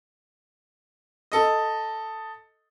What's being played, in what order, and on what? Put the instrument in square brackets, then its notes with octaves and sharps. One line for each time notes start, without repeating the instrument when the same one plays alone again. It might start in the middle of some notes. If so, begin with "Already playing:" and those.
[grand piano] A4 D#5